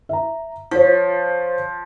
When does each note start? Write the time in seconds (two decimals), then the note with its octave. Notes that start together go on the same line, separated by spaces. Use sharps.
0.09 E5 A#5
0.71 F3 F4 C5 C#5